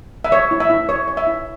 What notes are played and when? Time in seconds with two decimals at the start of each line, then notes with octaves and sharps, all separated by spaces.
0.24 E5
0.32 C#5
0.51 E4
0.60 E5
0.70 E4
0.89 C#5
1.08 C#5
1.17 E5
1.27 E4